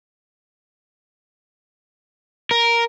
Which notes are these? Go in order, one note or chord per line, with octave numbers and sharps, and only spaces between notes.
A#4